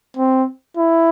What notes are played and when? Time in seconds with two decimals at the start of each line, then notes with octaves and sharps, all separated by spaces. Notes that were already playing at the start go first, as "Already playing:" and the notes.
0.17 C4
0.77 E4